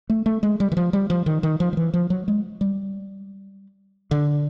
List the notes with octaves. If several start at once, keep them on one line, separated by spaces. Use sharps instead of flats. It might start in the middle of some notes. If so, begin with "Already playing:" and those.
A3
A3
G#3
G3
E3
F3
G3
F3
D#3
D#3
F3
F3
E3
F3
F#3
G#3
G3
D3